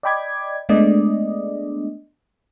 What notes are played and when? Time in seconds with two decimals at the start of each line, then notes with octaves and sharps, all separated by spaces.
0.03 D5 D#5 G5 B5 D6 G#6
0.69 G#3 A3 B3 D4 D5 D#5